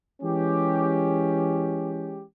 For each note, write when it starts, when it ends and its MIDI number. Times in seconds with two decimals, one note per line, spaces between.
0.22 2.23 52
0.22 2.23 56
0.22 2.23 61
0.22 2.23 67